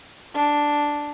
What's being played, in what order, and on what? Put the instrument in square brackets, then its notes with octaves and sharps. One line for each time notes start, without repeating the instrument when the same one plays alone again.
[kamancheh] D4